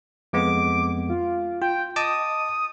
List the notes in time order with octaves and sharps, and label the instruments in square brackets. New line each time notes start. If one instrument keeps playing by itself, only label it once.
[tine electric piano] F2 G#3 B3 [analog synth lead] D6
[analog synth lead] F4
[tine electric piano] F4 [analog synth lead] G5
[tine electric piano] D#5 A5 D6 [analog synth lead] D#6